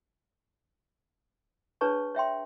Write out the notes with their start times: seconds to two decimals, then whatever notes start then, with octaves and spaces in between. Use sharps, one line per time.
1.81 D4 G#4 B4 C#5 A5 C#6
2.15 C#5 E5 G5 C6